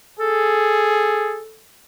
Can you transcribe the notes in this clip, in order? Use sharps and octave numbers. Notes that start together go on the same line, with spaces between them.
G#4 A4